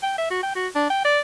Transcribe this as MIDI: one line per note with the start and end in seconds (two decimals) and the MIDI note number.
0.03 0.14 79
0.18 0.26 76
0.30 0.41 66
0.43 0.52 79
0.56 0.67 66
0.75 0.87 62
0.90 1.02 79
1.05 1.19 74